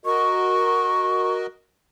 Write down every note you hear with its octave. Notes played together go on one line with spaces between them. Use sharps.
F#4 A#4 D#5 C#6